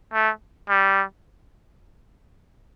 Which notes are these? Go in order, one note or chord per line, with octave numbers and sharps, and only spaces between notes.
A3
G3